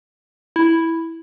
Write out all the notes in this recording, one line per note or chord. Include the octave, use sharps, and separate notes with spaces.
E4